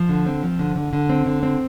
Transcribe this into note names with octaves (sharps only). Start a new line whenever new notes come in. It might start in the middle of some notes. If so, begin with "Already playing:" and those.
Already playing: F3
D3
C4
F3
D3
D3
D3
C4
D3
C4